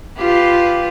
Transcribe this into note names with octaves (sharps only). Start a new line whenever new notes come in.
F4 G4 B4